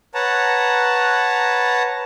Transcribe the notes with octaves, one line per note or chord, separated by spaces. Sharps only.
B4 C#5 F#5 A5 A#5